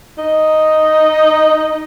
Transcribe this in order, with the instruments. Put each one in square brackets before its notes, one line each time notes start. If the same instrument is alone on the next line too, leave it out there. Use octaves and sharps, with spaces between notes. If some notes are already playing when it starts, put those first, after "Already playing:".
[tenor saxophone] D#4